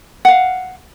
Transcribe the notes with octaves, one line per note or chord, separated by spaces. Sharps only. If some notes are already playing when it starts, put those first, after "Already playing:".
F5 F#5